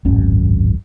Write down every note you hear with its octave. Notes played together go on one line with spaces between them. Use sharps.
D1 G#1 F#2 C#4